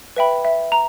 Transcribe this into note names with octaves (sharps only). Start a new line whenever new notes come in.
B4 E5 G5 B5
E5
A#5